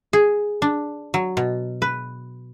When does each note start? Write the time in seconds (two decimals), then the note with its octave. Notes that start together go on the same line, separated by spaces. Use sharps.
0.13 G#4
0.62 D4
1.14 F#3
1.37 B2
1.82 B4